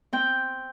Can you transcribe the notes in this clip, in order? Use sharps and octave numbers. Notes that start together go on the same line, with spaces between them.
C4 G5